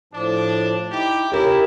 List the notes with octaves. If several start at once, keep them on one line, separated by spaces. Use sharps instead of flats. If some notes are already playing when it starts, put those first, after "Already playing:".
A2 F3 D4 A5
D#4 E4 G4
C#4 E4 G4 A#4 C#5